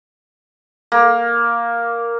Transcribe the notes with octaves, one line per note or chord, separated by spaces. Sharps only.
A#3